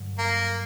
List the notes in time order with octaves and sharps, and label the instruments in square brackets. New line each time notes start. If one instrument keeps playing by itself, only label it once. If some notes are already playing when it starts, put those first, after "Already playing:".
Already playing: [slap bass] G2 D3 F#3
[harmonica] A#3